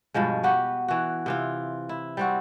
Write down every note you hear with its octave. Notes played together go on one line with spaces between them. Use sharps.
G2 B2 F3 G#3
B3 F#4 G4
E3 F#4
C3 E3 F4
E4
G3 C4 F#4